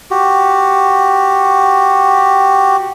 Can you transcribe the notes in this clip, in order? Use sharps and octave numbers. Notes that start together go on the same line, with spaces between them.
F#4 G4